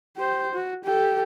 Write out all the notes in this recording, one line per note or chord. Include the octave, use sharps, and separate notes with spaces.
G4 C5
F#4
G4 A4